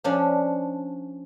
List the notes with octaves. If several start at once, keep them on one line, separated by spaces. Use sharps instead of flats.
F3 C#4 D4